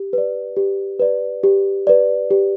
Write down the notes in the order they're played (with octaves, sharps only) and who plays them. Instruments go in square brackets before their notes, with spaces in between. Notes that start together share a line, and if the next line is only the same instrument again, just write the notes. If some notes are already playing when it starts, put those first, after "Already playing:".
Already playing: [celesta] G4
B4 D5
G4
B4 D5
G4
B4 D5
G4